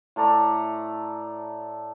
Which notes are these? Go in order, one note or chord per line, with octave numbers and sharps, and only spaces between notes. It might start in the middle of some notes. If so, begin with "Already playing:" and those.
A2 A4 D5 A#5